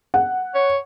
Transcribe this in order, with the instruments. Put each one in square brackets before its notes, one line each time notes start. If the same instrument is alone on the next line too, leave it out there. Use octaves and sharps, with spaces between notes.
[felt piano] F#5
[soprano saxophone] C#5